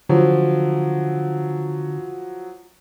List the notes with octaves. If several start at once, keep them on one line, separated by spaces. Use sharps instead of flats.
D3 F3 F#3